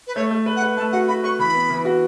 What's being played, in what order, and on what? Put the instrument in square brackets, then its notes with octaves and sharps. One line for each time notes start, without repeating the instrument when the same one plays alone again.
[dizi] B4
[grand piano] A3 [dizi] C#5
[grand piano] A3
B4
[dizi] F#5
[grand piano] B4
[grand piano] A3 [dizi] A5
[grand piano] F#4 [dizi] F#5
[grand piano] F#4 [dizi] B5
[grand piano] B4 [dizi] C#6
[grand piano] E3 [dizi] B5
[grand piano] B3
E3
F#4